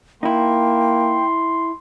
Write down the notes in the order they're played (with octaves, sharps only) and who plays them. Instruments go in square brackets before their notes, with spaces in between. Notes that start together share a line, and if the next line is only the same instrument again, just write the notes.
[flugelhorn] A#3 [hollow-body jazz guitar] D#4 E4 [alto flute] G5 [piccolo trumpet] C6